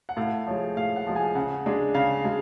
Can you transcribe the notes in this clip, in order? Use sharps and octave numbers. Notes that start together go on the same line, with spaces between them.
F#5
A2 F5
F3 G#3 C#5
A2 F5
F#5
F3 G#3
G#5
C#3 F#5
G#3 D4
C#3 F5
G#3